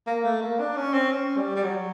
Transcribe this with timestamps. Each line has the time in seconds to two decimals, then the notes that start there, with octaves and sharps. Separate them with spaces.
0.07 A#3
0.24 A3
0.41 A#3
0.59 D4
0.76 C#4
0.93 C4
1.12 C#4
1.37 G3
1.55 G3
1.63 F#3